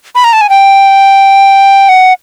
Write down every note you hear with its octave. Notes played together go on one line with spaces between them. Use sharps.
B5
A#5
A5
G#5
G5
F#5